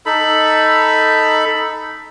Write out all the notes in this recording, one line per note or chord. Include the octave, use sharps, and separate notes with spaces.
D#4 A4 B5